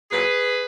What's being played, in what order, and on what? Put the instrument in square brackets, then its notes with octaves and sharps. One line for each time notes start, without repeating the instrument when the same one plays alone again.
[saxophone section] A#2 F#3 G#4 B4